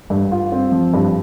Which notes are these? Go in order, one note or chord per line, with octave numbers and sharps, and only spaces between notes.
G2
F4
C4
F3
G2